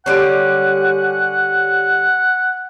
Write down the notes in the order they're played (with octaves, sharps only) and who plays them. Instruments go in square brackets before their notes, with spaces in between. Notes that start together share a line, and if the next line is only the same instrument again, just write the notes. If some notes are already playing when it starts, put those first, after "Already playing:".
[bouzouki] D3 G3 C#4 [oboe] F#5